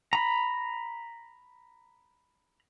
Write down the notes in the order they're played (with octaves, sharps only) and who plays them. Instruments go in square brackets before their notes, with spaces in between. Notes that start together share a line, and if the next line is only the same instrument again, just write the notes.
[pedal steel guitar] A#5 B5